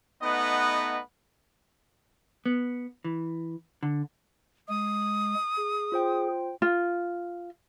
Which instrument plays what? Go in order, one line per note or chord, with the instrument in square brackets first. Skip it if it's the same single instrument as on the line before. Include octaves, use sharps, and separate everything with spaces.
[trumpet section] A3 B3 D#4 B4 D#5 F#5
[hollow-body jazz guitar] B3
E3
D3
[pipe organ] G#3 [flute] D#6
[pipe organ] G#4
[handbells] F4 C5 G5
[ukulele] F4